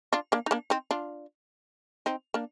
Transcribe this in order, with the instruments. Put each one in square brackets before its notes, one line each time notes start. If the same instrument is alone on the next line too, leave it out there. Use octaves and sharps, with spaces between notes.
[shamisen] D4 F4
A#3 D4
D#4
A#3 D4
C4 D#4
D4 F4
C4 D#4
A#3 D4